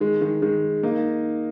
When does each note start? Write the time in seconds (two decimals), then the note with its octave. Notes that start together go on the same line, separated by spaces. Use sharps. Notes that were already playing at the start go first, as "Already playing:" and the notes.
0.01 D#3 G#3
0.21 D#3 G#3
0.42 D#3 G#3
0.83 A#3 D#4